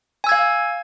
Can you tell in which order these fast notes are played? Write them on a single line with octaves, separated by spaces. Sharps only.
G#5 E6 G#6 F5